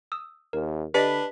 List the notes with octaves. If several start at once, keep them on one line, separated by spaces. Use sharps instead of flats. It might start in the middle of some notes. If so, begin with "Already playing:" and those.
D#6 E6
D#2 A#4
D3 D4 G4 B4 D5 D#5